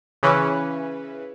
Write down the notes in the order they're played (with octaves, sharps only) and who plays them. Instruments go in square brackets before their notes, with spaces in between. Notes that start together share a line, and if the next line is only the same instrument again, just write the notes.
[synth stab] C#3 E3 C#4 B4